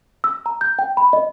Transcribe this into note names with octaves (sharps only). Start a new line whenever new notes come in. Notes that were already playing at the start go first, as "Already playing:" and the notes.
E6
A#5
G6
G5
B5
D#5